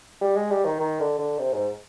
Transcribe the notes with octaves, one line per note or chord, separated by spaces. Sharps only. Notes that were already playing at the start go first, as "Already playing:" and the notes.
G3
G#3
G3
D#3
D#3
D3
D3
C3
G#2